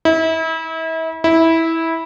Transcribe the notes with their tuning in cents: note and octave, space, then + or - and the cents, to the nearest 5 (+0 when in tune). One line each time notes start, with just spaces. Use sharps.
E4 -35
E4 -15